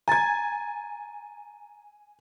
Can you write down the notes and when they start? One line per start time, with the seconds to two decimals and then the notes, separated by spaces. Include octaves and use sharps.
0.08 G#5 A#5 G#6 A6